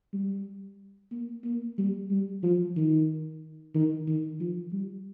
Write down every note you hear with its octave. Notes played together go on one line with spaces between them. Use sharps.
G3
A#3
A#3
G3
G3
F3
D#3
D#3
D#3
F3
G3